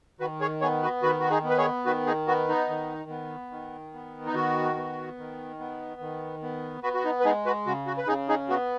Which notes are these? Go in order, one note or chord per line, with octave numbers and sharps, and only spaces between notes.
D#3 F#4 B4
G#4 C#5
B3 G#4 C#5
F#4 B4
D#3 F#4 B4
F#4
D#4 G#4
B3
B4
G#4 C#5
D#3 F#4 B4
D#4 G#4
B3 F#4
D#4
D#3
B3
D#3
B3
D#4
D#3 F#4
B3
D#3
B3
D#3
B3
B3 F#4 B4
F#4
D#4
B4
G#3 D#4 G#4
F#4 B4
C#3 F#4
F#4
B4
C#3 D#4 G#4
D#4 G#4
B3 F#4